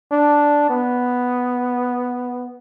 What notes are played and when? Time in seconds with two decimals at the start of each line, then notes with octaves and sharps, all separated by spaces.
0.12 D4
0.70 B3